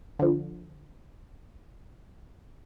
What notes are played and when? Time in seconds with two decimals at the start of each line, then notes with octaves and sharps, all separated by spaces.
0.19 D3 F3